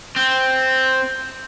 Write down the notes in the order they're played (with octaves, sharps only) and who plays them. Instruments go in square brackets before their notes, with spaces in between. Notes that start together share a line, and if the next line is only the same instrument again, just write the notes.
[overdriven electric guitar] C4